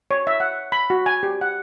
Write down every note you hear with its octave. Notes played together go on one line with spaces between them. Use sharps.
C#5
E5
F#5
B5
F#4
G#5
G4
F#5